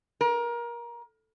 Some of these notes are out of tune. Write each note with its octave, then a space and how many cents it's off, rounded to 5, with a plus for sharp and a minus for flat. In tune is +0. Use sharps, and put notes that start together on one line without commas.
A#4 +25